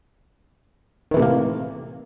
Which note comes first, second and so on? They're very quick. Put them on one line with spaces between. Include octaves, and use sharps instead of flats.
D#3 E3 C3 A2 A#3